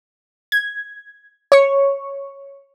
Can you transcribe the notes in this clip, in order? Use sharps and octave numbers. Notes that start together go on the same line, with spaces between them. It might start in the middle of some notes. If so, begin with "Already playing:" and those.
G#6
C#5 C#6